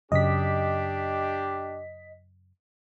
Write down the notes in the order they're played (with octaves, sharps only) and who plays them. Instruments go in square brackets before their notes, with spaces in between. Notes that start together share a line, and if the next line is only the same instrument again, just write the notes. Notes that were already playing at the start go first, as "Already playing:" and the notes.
[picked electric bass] F#2 C#3 [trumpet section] D4 G4 [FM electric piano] D#5 B6